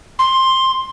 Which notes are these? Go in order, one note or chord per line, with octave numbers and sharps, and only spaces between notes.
C6